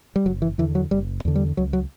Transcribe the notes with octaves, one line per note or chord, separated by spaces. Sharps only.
G3
F#1 F#3
E3
E2 D3 E3
F#3
F#1 G3
E2 D3
G3
C#2 F#3
F#3